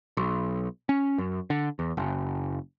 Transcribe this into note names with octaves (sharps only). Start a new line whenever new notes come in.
B1
C#4
F#2
D3
E2
F#1